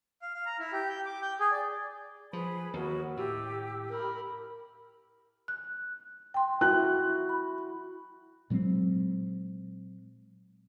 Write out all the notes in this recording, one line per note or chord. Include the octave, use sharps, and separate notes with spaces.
F5
F5
A#5
E4
G4
G5
D6
G5
G#4
D5
F3 G#4 B4 B5
D#2 F#4 A#4
A2 G4 E6
A#4 B5
F#6
G5 C6
E4 F#4 F#6
B5
A#2 F#3 G#3 C4